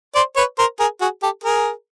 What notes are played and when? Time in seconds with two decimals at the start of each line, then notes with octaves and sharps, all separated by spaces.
0.15 C5 D5
0.36 B4 C#5
0.58 A#4 C5
0.80 G#4 A#4
1.01 F#4 G#4
1.23 G4 A4
1.44 G#4 A#4